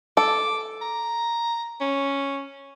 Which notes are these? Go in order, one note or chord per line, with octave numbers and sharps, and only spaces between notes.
A4 D6
A#5
C#4